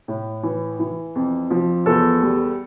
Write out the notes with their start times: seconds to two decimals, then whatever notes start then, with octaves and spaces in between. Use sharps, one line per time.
0.08 A2
0.43 E3
0.79 E3
1.15 F2
1.50 F3
1.86 E2 A4
2.23 G3